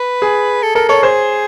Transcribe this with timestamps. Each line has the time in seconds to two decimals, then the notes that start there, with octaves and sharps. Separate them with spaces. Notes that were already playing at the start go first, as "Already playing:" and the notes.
Already playing: B4
0.22 G#4
0.63 A4
0.75 A4 A#4
0.89 A4 C#5
1.03 G#4 C5